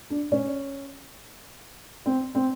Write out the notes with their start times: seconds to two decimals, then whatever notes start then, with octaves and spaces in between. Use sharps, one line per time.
0.10 D4
0.32 C#4
2.06 C4
2.35 C4